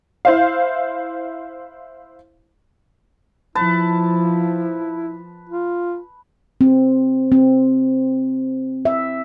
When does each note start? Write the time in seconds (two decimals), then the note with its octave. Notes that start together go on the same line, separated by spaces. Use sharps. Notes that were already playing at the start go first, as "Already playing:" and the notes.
0.25 E4 C5 F5
3.55 F3 E4 B4 A5
5.49 F4
6.61 C4
7.32 C4
8.85 E5